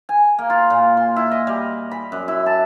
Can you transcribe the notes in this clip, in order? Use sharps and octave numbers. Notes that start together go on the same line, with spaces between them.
G#5
A#3
F4
A#2
C6
E4
D#5
G3
B5
F#2
E4
A5